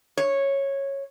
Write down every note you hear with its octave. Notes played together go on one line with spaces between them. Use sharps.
C#5